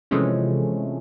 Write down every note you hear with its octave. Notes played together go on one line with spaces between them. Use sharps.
C3 E3 F3 G#3 A3 C#4